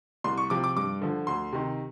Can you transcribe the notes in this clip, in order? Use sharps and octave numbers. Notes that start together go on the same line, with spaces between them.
C2 C6
C#6
C3 F3 D6
D6
G2 D6
D3 F3
D2 C6
C3 D#3